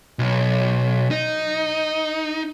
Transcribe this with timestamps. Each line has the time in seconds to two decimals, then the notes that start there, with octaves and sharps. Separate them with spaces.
0.19 B1
1.11 D#4